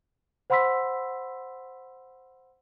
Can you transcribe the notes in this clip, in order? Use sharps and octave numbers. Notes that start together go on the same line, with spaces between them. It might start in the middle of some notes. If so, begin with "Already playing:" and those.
C5 F#5 B5 C6 E6 B6